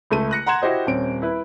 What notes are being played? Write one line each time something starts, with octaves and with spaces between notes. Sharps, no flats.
C#2 A3 D#7
F#6 A#6 C#7
F#5 A#5 C6 G#6 E7
E4 F#4 G4 C5 D#5
D#1 C4 C#4 D7
E4 B4